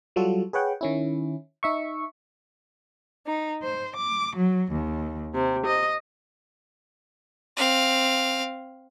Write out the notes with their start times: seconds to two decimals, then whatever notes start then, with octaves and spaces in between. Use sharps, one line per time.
0.16 F#3 G3 F4 F#4 A4
0.53 G#4 B4 C#5 F#5 G5
0.81 D#3 C#4 E4
1.63 D#4 E5 C#6
3.27 D#4
3.62 C5
3.97 D6
4.37 F#3
4.72 D#2
5.34 C3
5.66 D#5
7.57 C4 F5